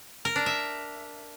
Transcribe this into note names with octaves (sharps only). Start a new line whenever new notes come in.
A#4
D4
E5